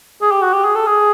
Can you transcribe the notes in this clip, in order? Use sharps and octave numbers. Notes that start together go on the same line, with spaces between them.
G#4
G4
F#4
G4
G#4
A4
G#4